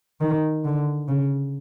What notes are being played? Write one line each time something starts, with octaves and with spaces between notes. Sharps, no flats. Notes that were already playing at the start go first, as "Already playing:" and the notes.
D#3
D3
C#3